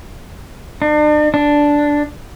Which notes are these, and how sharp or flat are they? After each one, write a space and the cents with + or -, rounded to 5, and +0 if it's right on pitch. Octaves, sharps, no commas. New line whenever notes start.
D4 +40
D4 -5